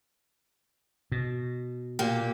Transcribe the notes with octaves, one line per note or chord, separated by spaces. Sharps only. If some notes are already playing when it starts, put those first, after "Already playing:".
B2
A#2 A#3 G4